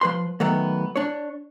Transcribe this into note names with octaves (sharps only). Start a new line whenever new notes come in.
F3 B4 C6
D#3 F#3 A3 B3
D4 C#5